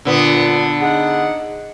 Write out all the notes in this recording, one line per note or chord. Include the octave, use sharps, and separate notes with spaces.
A#2 D3 B3
D#4 G#4 F#5